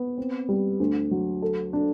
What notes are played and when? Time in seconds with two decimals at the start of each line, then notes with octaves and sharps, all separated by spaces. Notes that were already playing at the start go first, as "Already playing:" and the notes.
Already playing: B3
0.18 C4
0.49 G3
0.80 D2
1.11 F#3
1.42 A4
1.73 D4